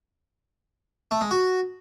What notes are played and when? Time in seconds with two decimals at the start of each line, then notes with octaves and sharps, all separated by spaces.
1.11 A3
1.21 G#3
1.31 F#4